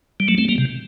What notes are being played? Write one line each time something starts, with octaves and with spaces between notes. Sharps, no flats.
G3
F#3 A3
A3 C4
G3 A#3
C3